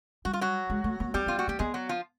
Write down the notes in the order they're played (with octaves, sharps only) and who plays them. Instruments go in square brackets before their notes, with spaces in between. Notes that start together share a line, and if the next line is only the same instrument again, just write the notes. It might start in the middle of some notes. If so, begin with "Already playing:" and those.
[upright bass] G3 [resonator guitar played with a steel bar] F#4
[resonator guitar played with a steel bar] F4
F#3 F#4
[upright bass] G#3
A3
A#3
[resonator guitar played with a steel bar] G3 G4 [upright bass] B3
[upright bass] B3 [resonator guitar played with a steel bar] F4
[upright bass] A#3 [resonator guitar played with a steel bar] F#4
[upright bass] A#3 [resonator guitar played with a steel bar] G4
[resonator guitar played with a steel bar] G#3 G#4 [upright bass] B3
[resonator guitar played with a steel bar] F#3 F#4
F3 F4